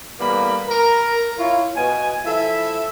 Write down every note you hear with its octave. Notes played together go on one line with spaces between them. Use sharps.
A2 E3 G3 A#3 B3 B5
A#4 A#5
E4 F4 C#5
B2 G#5
F3 E4 A4 E5